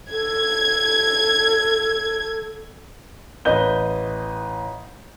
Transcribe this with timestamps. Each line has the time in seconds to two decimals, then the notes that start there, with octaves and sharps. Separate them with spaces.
0.12 A4 G#6
3.45 A1 B4 D#5 G6 G7